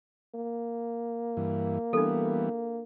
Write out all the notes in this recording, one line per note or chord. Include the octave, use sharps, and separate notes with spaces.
A#3
G2 E3
E3 G3 B3 D4 A4